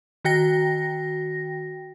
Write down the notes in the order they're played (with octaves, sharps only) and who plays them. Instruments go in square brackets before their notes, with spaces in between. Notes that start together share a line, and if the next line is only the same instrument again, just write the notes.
[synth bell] D#3 F#4 G5 A#6